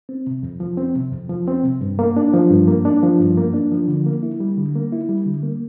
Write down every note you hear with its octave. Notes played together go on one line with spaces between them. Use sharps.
C4
C3
F2
F3
C4
C3
F2
F3
C4
C3
G2
A#3
D4
F3
G2
A#3
D4
F3
G2
A#3
D4
F3
D3
A#3
E4
G3
D3
A#3
E4
G3
D3
A#3